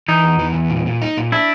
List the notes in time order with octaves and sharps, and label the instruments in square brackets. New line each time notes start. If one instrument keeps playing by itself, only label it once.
[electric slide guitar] E3 [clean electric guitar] D#4
[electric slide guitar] E2
E3
E2
A#2
A#2
D#4
A#2
[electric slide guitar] D4 [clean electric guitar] E4